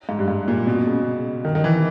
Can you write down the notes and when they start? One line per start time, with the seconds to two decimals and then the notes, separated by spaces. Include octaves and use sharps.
0.09 G#2
0.19 G2
0.28 G#2
0.48 A#2
0.67 B2
0.86 C#3
1.45 D#3
1.55 D#3
1.64 E3